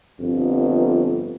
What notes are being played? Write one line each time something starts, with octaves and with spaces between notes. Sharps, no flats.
G1 F2